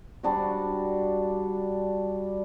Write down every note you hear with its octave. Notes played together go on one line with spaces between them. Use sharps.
G3 D4 F#4